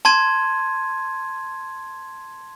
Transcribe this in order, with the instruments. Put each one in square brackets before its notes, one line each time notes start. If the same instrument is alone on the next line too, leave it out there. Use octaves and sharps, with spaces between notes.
[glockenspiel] A5 C6 G#6 D#7